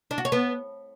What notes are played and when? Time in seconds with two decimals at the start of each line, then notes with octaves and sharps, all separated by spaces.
0.11 D4
0.18 F#4
0.25 C#5
0.32 B3